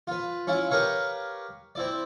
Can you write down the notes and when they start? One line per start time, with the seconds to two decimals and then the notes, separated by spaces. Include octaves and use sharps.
0.07 F4 B4
0.47 C#4 E4 F4
0.71 G4 A#4 B4 C#5 F5
1.75 C4 E4 D5